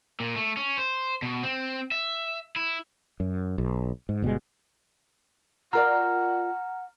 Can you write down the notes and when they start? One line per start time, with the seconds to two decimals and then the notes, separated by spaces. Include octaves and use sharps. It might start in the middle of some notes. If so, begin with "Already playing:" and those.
0.20 A#2
0.36 A3
0.57 C#4
0.78 C5
1.22 B2
1.43 C4
1.92 E5
2.56 E4
3.20 F#2
3.58 B1
4.09 G#2
4.22 G1 B2 G3 G#3
5.73 F4 A#4 D5 F#5 A#5 F6